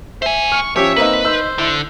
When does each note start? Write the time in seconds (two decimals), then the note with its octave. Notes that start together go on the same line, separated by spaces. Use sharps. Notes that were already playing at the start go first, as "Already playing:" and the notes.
0.22 C5 E5 G#5
0.52 C#6 F6
0.76 F3 C#4 G4 C#5 E5
0.96 A#3 C4 D#4 B4
1.25 D#4 C5 E6
1.58 D3 E4